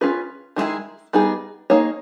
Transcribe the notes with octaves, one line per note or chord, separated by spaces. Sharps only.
C#4 F4 G#4 B4
D#3 G#3 B3 E4 G#4
G3 B3 D#4 G#4
A#3 D#4 G#4 C#5